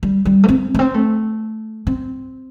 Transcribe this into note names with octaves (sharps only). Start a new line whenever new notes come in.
G3
G3
A3
C4
A3
C4
A3
C4